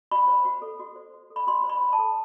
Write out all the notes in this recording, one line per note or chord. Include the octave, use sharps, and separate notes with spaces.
F#4 B5
C5
F#4
A4
F#4
C5
F#4
A4
B5
F#4 C6
C5
B5
F#4
A5
A4